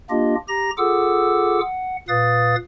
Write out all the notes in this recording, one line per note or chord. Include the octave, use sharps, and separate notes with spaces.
A#3 D4 F4 G4 D#5
G4 A#5 A#6
F4 G#4 A4 F#5 D6 E6
F#5
A#2 B4 F5 D#6 A6